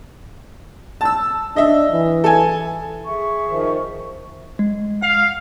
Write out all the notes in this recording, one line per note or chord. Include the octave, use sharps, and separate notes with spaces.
A5 E6
D4 D#5 E5
E3
A4 G#5
G#4 E5 C#6
D#3 F3
G#3
F5 F#5